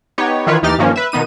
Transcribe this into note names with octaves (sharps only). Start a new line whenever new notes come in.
B3 D#4 G4 C#5
D#3 E3 F4 B4 C#5
D#2 E3 D#4 G4 F6 A6
G2 D#3 F3 A#3 C#4
B4 E5
B2 D#3 B3 D#4 D#7